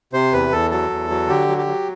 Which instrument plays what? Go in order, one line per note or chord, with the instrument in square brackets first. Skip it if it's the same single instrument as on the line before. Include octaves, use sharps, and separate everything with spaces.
[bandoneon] C3 C5
E2 B4
E2 A4
F#3 A4
E2
F#3
D3 G4
F#3
G4
F#3